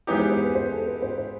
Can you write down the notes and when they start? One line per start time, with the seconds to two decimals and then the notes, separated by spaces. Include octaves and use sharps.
0.07 E3 G#3 B3 D#4 G4 C#5
0.19 C5
0.31 C5
0.44 B4
0.55 C5
0.71 A4
0.86 B4
1.02 C5
1.18 C5